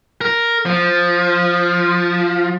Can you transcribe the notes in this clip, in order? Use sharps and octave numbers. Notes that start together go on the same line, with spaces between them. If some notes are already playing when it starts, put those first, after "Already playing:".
A#4
F3